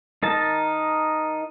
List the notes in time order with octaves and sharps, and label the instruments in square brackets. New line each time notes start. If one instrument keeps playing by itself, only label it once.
[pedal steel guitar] D#4 A#4 A5